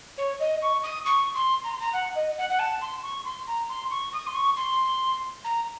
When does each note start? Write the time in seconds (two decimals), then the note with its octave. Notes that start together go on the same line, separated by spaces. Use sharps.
0.18 C#5
0.40 D#5
0.62 C#6
0.84 D#6
1.06 C#6
1.35 C6
1.64 A#5
1.72 C6
1.80 A#5
1.93 F#5
2.15 D#5
2.38 F#5
2.50 F#5
2.59 A5
2.81 C6
3.03 C#6
3.25 C6
3.47 A#5
3.69 C6
3.91 C#6
4.13 D#6
4.27 C6
4.35 C#6
4.57 C6
5.44 A#5